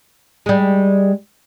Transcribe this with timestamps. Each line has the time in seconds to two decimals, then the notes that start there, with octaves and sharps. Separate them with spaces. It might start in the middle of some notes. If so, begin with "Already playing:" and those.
0.46 G3 G#3